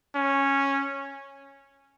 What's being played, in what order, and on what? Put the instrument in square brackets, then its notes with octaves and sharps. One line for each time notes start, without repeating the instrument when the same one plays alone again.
[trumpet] C#4